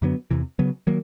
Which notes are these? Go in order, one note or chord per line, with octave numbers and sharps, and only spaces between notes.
F#2 D3 F#3 B3
E2 C3 E3
C#3 F#3 B3
D#3 F#3 A#3